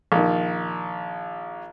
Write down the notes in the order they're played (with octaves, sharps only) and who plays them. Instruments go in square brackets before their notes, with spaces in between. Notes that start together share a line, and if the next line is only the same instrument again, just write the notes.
[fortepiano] A#1 D#3